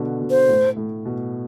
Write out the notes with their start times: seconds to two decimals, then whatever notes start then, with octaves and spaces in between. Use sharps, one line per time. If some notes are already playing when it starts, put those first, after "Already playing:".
Already playing: B2 D3
0.22 B2
0.30 C5
0.48 A2
0.76 A2
1.05 B2